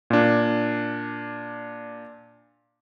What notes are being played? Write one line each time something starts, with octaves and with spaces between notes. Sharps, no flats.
A#2 D4